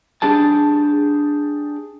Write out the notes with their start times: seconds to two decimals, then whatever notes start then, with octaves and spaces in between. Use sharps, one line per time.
0.22 D4 G4 G#4 A5